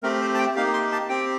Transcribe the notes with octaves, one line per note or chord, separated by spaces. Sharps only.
A3 C4 G4 A#4
C5
A5
G5
A#3 D#4 G4 F5
C6
A5
C4 G4 G5